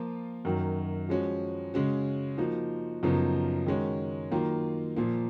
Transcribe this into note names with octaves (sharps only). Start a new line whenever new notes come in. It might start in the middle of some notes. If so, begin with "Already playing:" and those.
Already playing: F3 A#3 F4
F#2 D#3 F#3
F3 G#3 C#4 F#4
C#3 G#3 C#4 F#4
F3 A#3 D#4 F#4
F#2 C#3 F3 B3 D#4
D#3 G#3 C#4 F#4
D#3 F#3 A#3 F4
A#2 F3 A#3